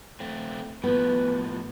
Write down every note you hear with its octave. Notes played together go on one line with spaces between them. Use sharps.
A3 C4
A2 F3 B3 B4